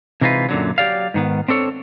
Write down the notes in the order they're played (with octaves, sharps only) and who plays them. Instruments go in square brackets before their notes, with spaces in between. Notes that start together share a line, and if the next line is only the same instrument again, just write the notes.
[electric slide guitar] C3 E3 G#3 D#4 F4 B4
F#2 A#2 D3 F#3
F#3 G4 D5 F5
G#2 D#3 B3
C4 D4 A4 C#5